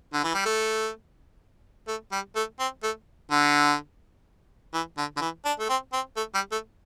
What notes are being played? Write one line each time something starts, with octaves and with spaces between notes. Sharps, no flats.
D3
E3
G3
A3
A3
G3
A3
C4
A3
D3
E3
D3
D3
E3
D4
A3
C4
C4
A3
G3
A3